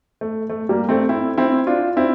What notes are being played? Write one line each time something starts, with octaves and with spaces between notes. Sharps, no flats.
A3
A3
G3 A#3
A3 C4
C4 E4
C4 E4
D4 F4
C4 E4